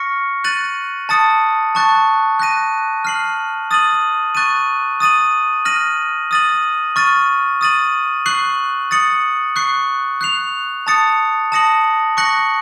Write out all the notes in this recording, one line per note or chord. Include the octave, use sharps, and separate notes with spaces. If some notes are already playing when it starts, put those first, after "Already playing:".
Already playing: C#6 F6 A#6 C#7
F#6 A6 D#7 F#7
A5 D#6 A6 C#7
A5 C#6 F#6 A6
F#6 A#6 D#7
F6 C7 F#7
D#6 A6 D#7 F#7
C#6 F#6 A6 D#7
D#6 A6 D#7 F#7
F6 A#6 D#7 F#7
D#6 A6 D#7 F#7
C#6 F6 A6 D#7
D#6 A6 D#7 F#7
C#6 F#6 C7 F#7
D#6 A6 C#7 F#7
C#6 F#6 C7
F#6 C7 F7
A5 D#6 A6 C#7
A5 D#6 A#6 C#7 F#7
C#6 F#6 A#6 C#7 F#7